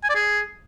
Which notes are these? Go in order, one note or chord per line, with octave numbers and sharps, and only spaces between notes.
G#5
D5
G#4